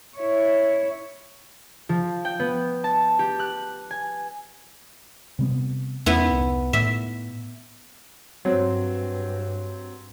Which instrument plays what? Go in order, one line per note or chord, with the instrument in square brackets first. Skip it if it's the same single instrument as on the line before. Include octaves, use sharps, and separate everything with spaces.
[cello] E4 C#5
[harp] F3
G5
B3
A5
G4
F#6
G#5
[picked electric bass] C3 G3 B3
[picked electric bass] E2 C#4 [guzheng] B3 E4
[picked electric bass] C2
[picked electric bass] A2 [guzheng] E5
[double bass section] G2 [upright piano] F#3 C4